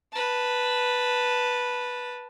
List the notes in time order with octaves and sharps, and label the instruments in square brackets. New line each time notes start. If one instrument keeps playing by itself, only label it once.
[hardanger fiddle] B4 A5